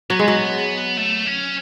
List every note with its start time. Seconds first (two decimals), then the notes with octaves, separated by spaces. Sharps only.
0.10 F#3 B3
0.19 G#3
0.28 F#3
0.97 A3
1.26 C#4